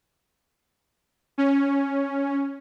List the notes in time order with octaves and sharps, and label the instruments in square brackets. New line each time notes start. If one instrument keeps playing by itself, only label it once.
[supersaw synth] C#4